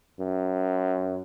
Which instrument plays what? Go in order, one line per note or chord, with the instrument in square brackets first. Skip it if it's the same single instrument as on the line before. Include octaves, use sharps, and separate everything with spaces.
[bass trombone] F#2